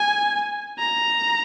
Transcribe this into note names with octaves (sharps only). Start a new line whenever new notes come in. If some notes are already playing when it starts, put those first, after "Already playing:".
Already playing: G#5
A#5